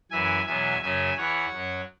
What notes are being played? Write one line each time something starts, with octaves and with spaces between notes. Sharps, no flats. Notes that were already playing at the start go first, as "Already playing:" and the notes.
F#2 E3 E5 G#5
E2 B2 F#3 E5 G#5
F#2 C#3 F#3 E5 G#5
E2 E3 C#5 F#5
F#2
F#3